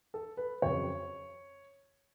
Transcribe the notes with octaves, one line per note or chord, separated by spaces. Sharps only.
A4
B4
F2 C#3 F#3 C#5